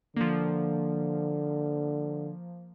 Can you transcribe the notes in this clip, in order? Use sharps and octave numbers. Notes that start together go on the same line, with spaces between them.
D3 F3 A#3